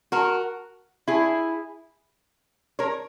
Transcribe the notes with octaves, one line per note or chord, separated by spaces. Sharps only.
F#4 A#4
E4 G#4
A#4 C#5